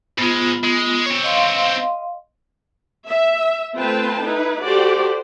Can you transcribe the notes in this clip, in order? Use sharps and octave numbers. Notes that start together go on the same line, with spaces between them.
G#2 G#3 B3 F4
G#3
C4 C#5
D#5 F5 C6
E5
A3 C4 F4 B4 G5 A5
D#4 E4 B4
F#4 G4 A4 C5 D5